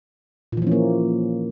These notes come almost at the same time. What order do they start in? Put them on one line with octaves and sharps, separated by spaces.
A#2 E3 F3 C#4 A#3